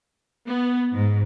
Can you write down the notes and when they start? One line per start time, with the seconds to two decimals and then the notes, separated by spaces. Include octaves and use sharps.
0.47 B3
0.93 G#2